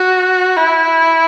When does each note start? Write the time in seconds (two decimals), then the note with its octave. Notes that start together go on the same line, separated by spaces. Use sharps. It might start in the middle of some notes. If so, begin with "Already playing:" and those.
Already playing: F#4
0.57 E4